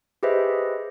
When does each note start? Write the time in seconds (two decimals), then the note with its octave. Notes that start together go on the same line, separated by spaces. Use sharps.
0.23 G4 G#4 B4 C5 D#5 E5